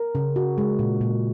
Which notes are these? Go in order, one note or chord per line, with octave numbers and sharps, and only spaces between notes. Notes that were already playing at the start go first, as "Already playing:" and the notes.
Already playing: A#4
C#3
F#4
G#3
A#2
A#2